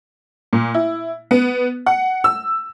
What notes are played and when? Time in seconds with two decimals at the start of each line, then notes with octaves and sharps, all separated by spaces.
0.53 A#2
0.74 E4
1.31 B3
1.86 F#5
2.24 E6